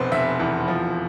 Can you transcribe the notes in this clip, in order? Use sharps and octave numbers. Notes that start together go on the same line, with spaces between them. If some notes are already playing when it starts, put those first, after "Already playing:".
Already playing: F1 B2 B4 C5
F1 E5
E2
F3